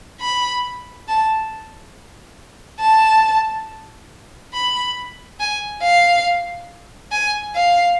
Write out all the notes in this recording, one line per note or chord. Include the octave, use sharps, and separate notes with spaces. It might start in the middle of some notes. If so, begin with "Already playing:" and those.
B5
A5
A5
B5
G#5
F5
G#5
F5